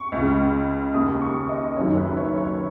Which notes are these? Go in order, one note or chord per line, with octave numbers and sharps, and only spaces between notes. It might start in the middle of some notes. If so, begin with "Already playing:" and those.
Already playing: C#6
C#2 C#3
D#2 C#3 D#6
C#6
D#5
F#1 F#2 D#3 C#5
B4
C#5
C#5